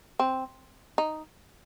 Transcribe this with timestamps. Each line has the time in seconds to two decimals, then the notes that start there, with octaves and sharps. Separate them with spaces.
0.19 C4
0.98 D#4